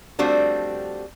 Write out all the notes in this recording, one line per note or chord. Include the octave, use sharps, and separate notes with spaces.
F3 G3 A3 C4 D4 F#4